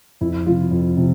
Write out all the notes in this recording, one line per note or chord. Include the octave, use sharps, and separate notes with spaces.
F2 E4
C3 F3 F4
F2
C3 F3